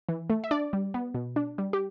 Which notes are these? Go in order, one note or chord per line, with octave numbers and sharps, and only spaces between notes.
E3
A3
E5
D4 D5
G3
B3
B2
D4
G3
G4